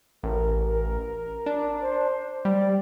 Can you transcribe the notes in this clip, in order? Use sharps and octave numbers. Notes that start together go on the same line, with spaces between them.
A1 A#4
A#4
D4
C5
G3 D5